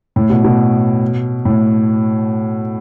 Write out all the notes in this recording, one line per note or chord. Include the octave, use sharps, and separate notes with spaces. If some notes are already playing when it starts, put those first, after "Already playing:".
A2
B2
B2
A2